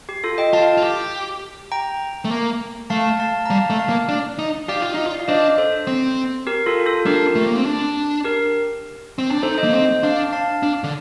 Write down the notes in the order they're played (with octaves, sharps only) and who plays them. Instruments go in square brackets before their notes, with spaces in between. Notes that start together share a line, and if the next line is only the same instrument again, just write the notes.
[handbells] G4
F4 A4
D#5 G5
[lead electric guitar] F4 [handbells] F5 A5
[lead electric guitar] F4
G4
[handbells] G5 A#5
[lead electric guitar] A3
A#3
[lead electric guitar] A3 [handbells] F5 A5
[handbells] F5 A5
A#5
[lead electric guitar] G3 [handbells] F5 A5
[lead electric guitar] A3
[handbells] F5 A5
[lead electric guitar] A#3
D4
D#4
[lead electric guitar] G4 [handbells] D5 F5
[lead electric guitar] F4
D#4
F4
[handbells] F5
[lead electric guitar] D4 [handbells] C5 D#5
[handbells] A4 C5
[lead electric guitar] C4
[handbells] G4 A#4
F4 A4
F4 A4
[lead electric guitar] D4 [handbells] G4 A#4
[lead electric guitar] A3
A#3
C4
D4
[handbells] G4 A#4
[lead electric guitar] C4
D4
[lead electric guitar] D#4 [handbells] A4 C5
[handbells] C5 D#5
[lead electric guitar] A#3
[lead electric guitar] C4 [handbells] C5 D#5
[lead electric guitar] D4 [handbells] F5 A5
[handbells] F5 A5
[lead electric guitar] D4
D3